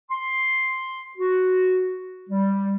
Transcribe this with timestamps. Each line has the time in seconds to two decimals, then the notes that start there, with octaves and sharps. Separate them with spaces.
0.11 C6
1.17 F#4
2.29 G3